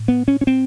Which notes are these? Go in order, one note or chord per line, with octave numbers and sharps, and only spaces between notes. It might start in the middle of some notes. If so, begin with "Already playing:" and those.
Already playing: A2
B3
C#4
C#4
C4